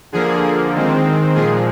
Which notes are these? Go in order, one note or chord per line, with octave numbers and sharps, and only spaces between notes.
D3 F3 A#3 G#4
D#3 G#3 C4
A#2 F3 G#3 G#4